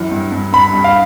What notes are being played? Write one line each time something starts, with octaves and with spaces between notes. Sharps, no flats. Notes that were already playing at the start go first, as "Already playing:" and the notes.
Already playing: F#2 E3
G2
G2
G2 B5
G2
F5